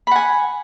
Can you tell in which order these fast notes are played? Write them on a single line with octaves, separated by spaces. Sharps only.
B5 F#5 G#5